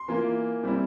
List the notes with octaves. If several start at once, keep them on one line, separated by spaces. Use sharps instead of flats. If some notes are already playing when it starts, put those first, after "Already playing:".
Already playing: C6
E3 A#3 F4
G3 C4 E4